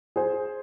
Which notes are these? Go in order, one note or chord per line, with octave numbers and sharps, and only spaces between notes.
G#4 C5